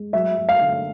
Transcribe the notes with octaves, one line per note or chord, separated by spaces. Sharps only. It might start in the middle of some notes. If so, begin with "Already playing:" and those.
Already playing: G#3
F#3 E5
F#3
F5
D3